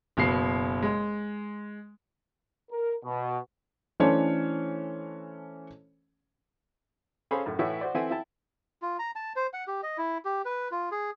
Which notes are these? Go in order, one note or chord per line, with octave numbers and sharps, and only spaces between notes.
F#1 B2 C7
G#3
A#4
B2
E3 A3 C#4 D4 C5 C#5
C#4 G#4 A4 C5 F5 B5
F#2 A2 A3
A2 E3 E4 F#4 C#5
F#4 C5 D5
E3 C4 E4 A4 F#5 G#5
E4 G5 A5
F4
A#5
A5
C5
F#5
G4
D#5
E4
G4
B4
F4
G#4